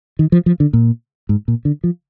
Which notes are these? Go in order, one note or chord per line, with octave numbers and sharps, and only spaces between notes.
D#3
F3
F3
D3
A#2
G#2
A#2
D3
F3